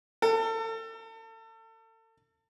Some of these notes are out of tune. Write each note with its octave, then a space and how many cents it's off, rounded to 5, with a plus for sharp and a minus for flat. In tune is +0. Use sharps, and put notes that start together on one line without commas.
A4 +35